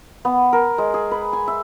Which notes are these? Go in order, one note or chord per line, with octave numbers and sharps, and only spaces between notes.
B3
A#4
G#3
G#4
B4
G#5
E5